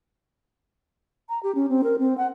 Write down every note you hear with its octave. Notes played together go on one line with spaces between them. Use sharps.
A#5
G4
C#4
C4
A#4
C4
F#5